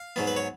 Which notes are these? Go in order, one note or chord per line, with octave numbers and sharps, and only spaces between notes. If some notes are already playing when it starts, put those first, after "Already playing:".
Already playing: F5
G#2 F#3 B3
B4
C#5